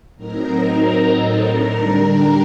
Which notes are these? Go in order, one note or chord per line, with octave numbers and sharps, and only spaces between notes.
A2 F#3 C4 D#4 A#4 A#5
F#3 C4 D#4
F#3 C4 D#4
A2 F#3 C4 D#4 A4 A5
A2 A3 D4 A#4 A#5
D3 G3 D4